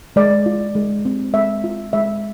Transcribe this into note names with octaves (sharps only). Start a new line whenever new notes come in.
G#3 D5
F4
G#3
C4
G#3 E5
F4
G#3 E5